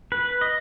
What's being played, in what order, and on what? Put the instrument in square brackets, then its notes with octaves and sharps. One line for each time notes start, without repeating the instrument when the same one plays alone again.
[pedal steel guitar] B4
D#5